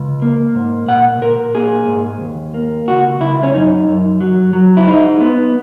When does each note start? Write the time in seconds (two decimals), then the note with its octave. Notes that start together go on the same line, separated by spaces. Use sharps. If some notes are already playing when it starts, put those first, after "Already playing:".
Already playing: C#2
0.22 A#3
0.55 G#2
0.88 A#2 F#5
1.22 A#2 A#4
1.54 A#3 G#4
1.87 G#2
2.21 D#2
2.54 A#3
2.88 C#2 F#4
3.20 C#2 E4
3.43 C#4
3.54 F#2 D#4
3.88 F#2
4.21 F#3
4.53 F#3
4.77 E4
4.87 G#3 D#4
5.20 B3